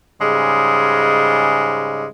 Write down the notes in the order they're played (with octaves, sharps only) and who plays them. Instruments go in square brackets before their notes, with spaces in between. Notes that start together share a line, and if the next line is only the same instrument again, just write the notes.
[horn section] G#2 C#3 G3 G#3